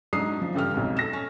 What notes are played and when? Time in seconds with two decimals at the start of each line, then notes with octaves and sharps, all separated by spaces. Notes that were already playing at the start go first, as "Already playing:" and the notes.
0.13 G#2 F#3 D4 D#6 C7
0.42 F3
0.55 A1 G2 C#3 A4 G5 F6
0.74 B1 F2 G#2
0.97 A4 A#6 E7
1.13 C#4